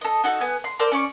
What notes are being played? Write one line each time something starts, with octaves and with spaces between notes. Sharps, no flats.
A4 D#5
D#4 F#4 A4
B3 G#5
C6
A4 A#4 C5 D5
C#4 D5 C#6